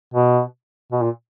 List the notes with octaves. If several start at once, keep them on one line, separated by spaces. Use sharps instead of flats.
B2
B2
A#2